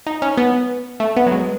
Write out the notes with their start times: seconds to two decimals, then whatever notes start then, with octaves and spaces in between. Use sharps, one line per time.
0.07 D#4
0.22 C#4
0.38 B3
1.00 A3
1.16 B3
1.26 F#3
1.32 G#3